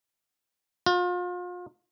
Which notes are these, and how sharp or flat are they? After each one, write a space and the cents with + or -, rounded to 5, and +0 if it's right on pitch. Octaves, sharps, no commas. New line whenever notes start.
F4 +35